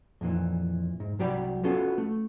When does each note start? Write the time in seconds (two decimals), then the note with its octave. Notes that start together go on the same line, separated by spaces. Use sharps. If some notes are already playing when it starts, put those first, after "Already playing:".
0.21 F2 A#2 D3 E3
1.00 G#2
1.19 C2 F#3 G4 D5 B5
1.64 B3 C#4 F4 F#4 A4
1.98 A3